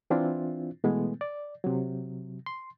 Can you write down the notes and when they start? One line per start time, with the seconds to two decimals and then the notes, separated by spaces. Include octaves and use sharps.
0.10 E3 C4 D4 E4 F4
0.84 B2 E3 G#3 A3 B3
1.21 D5
1.64 C3 F#3
2.46 C6